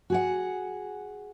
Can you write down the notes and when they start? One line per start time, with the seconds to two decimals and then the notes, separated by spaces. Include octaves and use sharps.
0.10 F#4 G#4 F#5